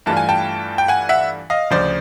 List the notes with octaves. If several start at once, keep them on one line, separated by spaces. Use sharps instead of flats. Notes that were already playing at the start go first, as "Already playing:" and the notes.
G2 E3 A3 D4 F4 A5
G#5
G5 A5
G5
F#5 G#5
E5 F#5
D#5 F5
D2 C#3 F3 C5 D5